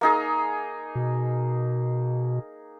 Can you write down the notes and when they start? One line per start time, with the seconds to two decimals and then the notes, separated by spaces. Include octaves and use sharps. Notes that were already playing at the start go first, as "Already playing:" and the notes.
0.01 A#3 D#4 G#4
0.95 B2